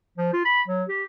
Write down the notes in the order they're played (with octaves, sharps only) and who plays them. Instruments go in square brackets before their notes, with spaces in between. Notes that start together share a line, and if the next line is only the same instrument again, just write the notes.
[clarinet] F3
F4
B5
F#3
G4